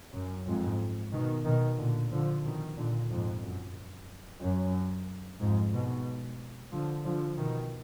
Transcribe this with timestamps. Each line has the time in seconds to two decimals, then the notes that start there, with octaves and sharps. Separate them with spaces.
0.14 F#2
0.47 F2 G#2
1.13 B2 D#3
1.46 B2 D#3
1.79 A#2 D3
2.12 D3 F3
2.45 B2 D#3
2.77 A#2 D3
3.11 F2 G#2
3.43 F#2
4.42 F#2
5.40 F2 G#2
5.73 G#2 B2
6.72 D3 F3
7.05 D3 F3
7.38 B2 D#3